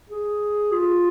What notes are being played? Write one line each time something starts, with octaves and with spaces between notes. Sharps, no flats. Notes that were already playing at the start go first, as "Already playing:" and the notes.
G#4
F4